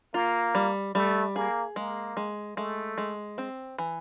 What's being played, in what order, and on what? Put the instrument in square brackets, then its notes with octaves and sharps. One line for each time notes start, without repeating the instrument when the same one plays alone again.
[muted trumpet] A#3 [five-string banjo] F4
[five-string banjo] G3
[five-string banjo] G3 [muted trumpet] A3
[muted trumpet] A#3 [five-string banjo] G#4
[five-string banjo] G#3 [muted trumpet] A#3
[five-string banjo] G#3
[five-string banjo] G#3 [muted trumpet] A3
[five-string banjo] G#3
C4
E3